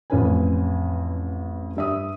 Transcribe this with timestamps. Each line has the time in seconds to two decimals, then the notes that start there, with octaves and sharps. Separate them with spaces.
0.10 A1 F2 C#4 B4 G#5
1.76 G2 E5 D#6